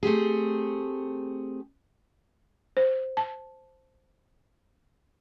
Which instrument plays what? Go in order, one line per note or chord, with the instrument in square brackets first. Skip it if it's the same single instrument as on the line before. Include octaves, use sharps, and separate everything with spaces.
[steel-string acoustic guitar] A3 C4 G4 G#4
[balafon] C5
A5